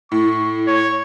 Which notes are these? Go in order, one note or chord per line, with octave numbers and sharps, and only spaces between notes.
A2 C#6
C#5